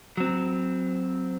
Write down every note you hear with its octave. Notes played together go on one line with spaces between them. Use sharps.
F#3 C4